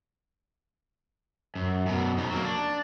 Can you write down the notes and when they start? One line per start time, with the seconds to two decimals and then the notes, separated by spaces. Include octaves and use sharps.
1.55 F#2
1.86 F#2 B2
2.18 F2 D#4
2.30 F#3 A#3
2.45 D4